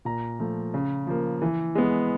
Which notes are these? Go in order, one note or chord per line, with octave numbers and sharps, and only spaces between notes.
A#2 A#5
F3 A3
C#3
F3 A#3
E3
G#3 B3